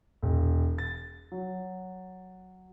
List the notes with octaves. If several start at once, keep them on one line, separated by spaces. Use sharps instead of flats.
E1
A6
F#3